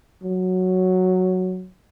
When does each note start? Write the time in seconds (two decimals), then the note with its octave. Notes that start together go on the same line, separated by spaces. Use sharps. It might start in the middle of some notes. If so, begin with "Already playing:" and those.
0.23 F#3